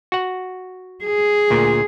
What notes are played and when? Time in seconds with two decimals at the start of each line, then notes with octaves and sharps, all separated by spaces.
0.12 F#4 F#5
1.04 G#4
1.50 D2 A#2